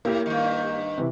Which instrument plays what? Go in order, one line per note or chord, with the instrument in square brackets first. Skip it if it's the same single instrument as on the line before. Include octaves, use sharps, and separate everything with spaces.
[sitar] A2 [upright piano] A#3 E4 G4
[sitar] G2 D#3
[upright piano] C3 E3